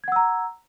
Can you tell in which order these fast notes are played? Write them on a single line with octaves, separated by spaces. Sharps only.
G#6 F#5 E6 A#5